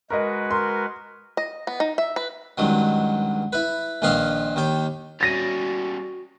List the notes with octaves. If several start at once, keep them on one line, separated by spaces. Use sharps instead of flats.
G#3 F#4 A#4 B4 D#5
A#4 C6
D#5
B3
D#4
E5
B4
C#2 G2 D#3 F#3
E4 B4
A#1 A#2 D#3 B4 D#5 F5
D#2 D#3 G5
G3 C#4 F#4 A6 A#6 D#7